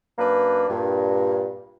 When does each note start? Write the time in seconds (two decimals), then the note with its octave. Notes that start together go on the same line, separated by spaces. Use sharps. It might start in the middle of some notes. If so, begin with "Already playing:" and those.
0.19 F#2 A#3 D4 B4
0.70 G2 A#2